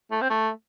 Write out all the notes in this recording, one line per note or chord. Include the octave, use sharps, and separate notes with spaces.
A3
C4
A3